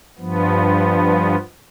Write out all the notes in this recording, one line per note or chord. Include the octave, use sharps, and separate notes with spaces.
G2 F3 B3